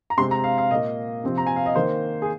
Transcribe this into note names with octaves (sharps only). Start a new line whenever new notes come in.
A#5
C3 G#3 C4 C6
A#5
F5
F5
A#2 A#3 D#5
C3 F3 C4
A#5
G#5
F5
D#5
D#3 A#3 C5
G#4